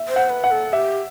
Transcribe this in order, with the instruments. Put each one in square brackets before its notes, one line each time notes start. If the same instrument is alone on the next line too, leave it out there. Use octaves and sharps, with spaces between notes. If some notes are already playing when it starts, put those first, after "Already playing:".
Already playing: [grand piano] E5
[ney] C5
[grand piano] F#5
[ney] B4
[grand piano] F#5
[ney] A4
[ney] G4 [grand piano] E5